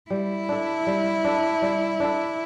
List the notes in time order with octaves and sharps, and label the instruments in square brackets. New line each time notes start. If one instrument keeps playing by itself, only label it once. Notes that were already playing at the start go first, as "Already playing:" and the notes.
[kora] G3 [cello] E4
[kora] D4 A4
G3
D4 A4
G3
D4 A4